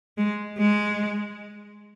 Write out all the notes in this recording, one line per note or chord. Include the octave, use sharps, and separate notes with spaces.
G#3
G#3